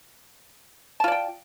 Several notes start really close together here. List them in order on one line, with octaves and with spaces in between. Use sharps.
A5 F4 D5 G5